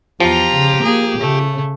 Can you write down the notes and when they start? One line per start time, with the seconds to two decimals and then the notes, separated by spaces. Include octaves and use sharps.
0.20 E2 F3 F4 G4 A#5
0.54 C#3
0.84 A#3 G#4
1.20 C#3 A3